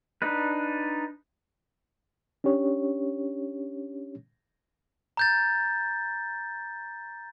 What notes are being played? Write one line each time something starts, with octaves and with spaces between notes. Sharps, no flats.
D4 D#4 B4
C#4 D4 G4 C#5
A#5 G6 A6